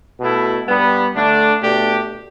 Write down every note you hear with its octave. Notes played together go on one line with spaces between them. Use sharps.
B2 A3 E4
G2 G3 B3
D3 A3 D4
B2 A3 D4 G4